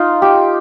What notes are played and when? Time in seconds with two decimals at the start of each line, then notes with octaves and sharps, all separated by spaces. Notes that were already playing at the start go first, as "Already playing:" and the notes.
Already playing: D#4 F4
0.22 G4